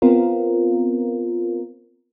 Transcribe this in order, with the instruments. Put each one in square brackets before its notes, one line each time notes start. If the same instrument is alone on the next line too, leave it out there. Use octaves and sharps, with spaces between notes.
[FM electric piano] B3 C4 F4 A#4